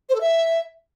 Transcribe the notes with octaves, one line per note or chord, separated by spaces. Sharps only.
C5
A4
E5